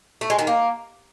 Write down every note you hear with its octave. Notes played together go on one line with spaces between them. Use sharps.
A3
G#3
D#3
A#3